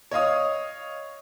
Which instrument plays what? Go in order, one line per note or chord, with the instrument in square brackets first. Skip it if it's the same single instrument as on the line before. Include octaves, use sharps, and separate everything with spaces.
[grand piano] C#5 D#5 F5 D#6